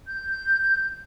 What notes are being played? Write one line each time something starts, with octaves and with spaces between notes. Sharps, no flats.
G6